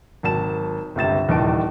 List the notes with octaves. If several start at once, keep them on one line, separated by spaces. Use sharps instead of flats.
G#1 F#3 A5 E7
G1 C#2 C3 A6 E7
D#1 E2 G3 D#4 A5 D7